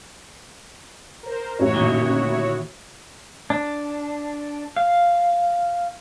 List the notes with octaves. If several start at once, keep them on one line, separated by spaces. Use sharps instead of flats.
A#4 C5
A1 F#2 E4 F#4 C#5
A#2 D3 D#3
D4
F5